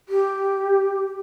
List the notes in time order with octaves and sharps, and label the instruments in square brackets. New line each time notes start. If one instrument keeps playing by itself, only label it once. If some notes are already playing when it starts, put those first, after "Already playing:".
[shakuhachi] G4